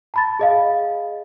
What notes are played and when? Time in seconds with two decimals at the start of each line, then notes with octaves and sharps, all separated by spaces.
0.14 A5 B5 A6
0.39 G#4 D#5 F5